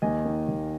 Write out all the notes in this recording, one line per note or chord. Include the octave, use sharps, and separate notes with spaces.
D#2 D#5 G#5
D#3
D#2